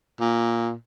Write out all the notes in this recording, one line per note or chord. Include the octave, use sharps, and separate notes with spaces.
A#2